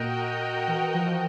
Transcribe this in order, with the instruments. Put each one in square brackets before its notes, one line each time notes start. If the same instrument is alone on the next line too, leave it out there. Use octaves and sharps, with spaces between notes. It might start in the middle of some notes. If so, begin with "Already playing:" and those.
Already playing: [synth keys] A#2 A#3 [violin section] F#4 A#4 D#5 G5
[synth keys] E3
E3
F3
F3